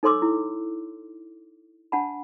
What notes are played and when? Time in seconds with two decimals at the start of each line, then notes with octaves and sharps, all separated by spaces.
0.03 D#4 A4 C#5 C6 D6 E6
0.22 E4
1.92 D4 F#5 A5 B5